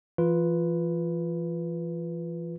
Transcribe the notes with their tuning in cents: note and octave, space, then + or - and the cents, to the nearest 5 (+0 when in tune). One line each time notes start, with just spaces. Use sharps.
E3 +35 F4 +0 B4 +0